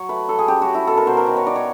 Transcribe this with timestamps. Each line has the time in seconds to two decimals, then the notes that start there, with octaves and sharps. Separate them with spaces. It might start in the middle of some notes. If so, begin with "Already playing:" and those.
Already playing: F#3 C#5
0.09 A3 B4
0.28 F#3 A4
0.39 G#4
0.48 C#4 G4
0.62 F#4
0.68 C#4
0.75 E4
0.87 B2 A4
0.97 A#4
1.07 B2 C5
1.17 A#4
1.26 D#3 B4
1.36 C#5
1.46 D#3 D5
1.56 C#5